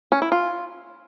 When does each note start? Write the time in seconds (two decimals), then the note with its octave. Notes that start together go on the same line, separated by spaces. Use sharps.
0.12 C#4
0.22 E4
0.32 F4